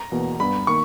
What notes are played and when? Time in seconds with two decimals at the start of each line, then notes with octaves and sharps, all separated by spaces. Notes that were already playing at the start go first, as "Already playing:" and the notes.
Already playing: A#5
0.12 E2 B2 A#3
0.40 G2 G3 B3 B5
0.67 D#3 A#3 C#6